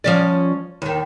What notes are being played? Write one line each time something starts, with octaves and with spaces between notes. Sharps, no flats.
F3 C#4 D5
D#2 D#3